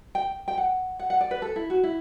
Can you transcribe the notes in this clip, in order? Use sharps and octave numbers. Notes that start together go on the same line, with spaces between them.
G5
G5
F#5
F#5
F#5
D5
B4
A4
E4
F#4
E4